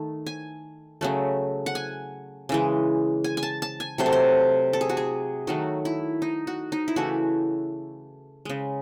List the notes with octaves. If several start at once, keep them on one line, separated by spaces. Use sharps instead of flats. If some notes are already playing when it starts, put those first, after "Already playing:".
Already playing: D#3 A3
G#5
C#3 F#3 A3
F#5
G#5
C#3 E3 G#3
G#5
G#5
A5
A5
G#5
C3 F#3 A3 C5
A4
C5
A4
G#4
F#4
G#4
D#3 F#3 A3 F#4
E4
D#4
F#4
D#4
E4
C#3 E3 A3 F#4
C#3 G#3